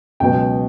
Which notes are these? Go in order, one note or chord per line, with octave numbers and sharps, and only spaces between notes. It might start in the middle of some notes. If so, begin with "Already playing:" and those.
C#2 B2 F#3 B3 G5